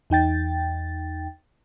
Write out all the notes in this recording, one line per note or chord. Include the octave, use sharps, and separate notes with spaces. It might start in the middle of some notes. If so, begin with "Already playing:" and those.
E2 D#4 G5 A6